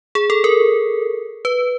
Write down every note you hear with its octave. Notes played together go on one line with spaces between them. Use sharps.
G#4
A4
A#4
B4